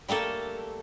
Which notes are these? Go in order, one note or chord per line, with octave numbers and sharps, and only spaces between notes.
G3 A3 A#3 A4